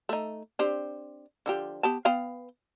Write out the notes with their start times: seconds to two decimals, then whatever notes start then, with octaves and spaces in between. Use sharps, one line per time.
0.09 A3 D#4
0.59 C4 D4 G4
1.46 D3 F3 G4
1.83 B3 G4 A5
2.05 B3 F5 G5